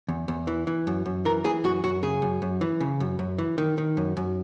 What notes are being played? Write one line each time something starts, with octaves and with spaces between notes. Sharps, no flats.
E2
E2
E3
E3
F#2
F#2
E3 A#4
E3 G#4
F#2 F#4
F#2 F#4
C#3 G#4
F#2
F#2
E3
C#3
F#2
F#2
E3
D#3
D#3
F#2
F#2